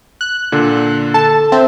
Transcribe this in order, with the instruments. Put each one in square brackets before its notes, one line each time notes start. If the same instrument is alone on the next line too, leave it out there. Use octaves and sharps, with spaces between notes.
[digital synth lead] F#6
[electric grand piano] A#2 D3 A4
[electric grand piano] A4 [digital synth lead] A5
[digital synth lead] C4 [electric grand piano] E5